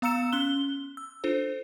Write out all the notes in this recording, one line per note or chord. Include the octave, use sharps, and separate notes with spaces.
B3 F5 A#5 E6 C#7 E7
C#4 C6 F#6 G7
E6
D4 F4 A4 C5